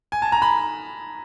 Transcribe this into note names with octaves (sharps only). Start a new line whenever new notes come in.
G#5
A5
A#5
B5